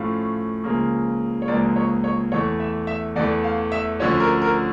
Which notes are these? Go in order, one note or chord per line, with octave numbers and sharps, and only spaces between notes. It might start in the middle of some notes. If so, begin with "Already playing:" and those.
Already playing: A2 F3 A3 C#4 F5
C#2 C#3 F3 A#3
C#5
C#2 C#3 F3 A#3 D5
C#5
C#5
E2 E3 A3 C#5
E5
E5
E2 E3 A3 D5
F5
E5
D2 D3 F3 C#4 C#5
A#4
A#4